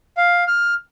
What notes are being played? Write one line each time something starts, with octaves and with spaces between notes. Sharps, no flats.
F5
F6